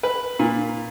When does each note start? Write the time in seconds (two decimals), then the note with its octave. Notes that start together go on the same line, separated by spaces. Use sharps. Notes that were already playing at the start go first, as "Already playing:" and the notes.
0.03 B4
0.39 A#2